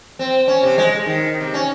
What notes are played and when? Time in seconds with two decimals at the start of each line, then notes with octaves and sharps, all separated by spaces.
0.19 C4
0.48 C#4
0.63 C3
0.78 G#3
1.06 D#3
1.40 C3
1.54 C#4